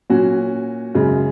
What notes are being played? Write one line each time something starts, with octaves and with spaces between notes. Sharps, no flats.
A#2 F#3 C#4 F#4
F#2 C#3 G#3